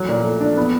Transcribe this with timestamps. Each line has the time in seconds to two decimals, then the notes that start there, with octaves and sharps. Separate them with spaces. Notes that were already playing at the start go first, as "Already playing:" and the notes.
Already playing: F#3
0.09 A#2
0.25 A3
0.41 D4
0.57 B3